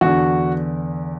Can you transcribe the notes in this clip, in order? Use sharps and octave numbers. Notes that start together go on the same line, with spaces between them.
E2 D3 F#4